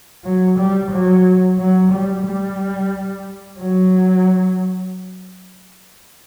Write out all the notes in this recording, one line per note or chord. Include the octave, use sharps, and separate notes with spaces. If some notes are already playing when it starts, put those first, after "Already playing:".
F#3
G3
F#3
F#3
G3
G3
F#3